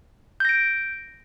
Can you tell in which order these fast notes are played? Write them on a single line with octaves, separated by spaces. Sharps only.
G6 A#6 D7